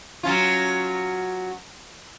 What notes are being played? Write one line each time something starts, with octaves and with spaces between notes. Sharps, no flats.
F#3 C#4 F4